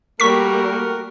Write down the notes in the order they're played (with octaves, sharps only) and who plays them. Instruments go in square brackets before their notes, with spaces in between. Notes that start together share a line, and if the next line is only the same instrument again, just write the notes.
[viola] G3 A#3 [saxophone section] A3 F#4 A#4 [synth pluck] C#6 B6